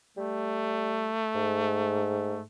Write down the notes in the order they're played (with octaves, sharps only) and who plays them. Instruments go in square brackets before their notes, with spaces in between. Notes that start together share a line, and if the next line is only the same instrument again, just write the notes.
[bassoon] G3 [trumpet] A3
[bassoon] G#2